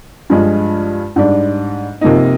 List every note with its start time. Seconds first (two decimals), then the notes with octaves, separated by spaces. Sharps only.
0.30 G2 F3 G#3
1.16 G#2 G3 D4
2.01 C3 F3 A#3 D#4